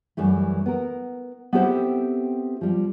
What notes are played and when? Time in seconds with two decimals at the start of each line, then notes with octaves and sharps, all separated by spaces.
0.17 F#2 E3 G3 A3
0.66 B3 A#4
1.53 B3 C4 E4 G4 A4 C5
2.61 F3 G3